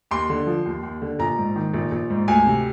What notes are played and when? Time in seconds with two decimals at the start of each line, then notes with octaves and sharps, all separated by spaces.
0.11 D#2 C6
0.30 D3
0.47 F3
0.65 D#2
0.83 D#2
1.02 D3
1.19 A#1 A#5
1.38 G#2
1.56 D#3
1.74 A#1
1.92 A#1
2.10 G#2
2.28 D2 G#5
2.46 C3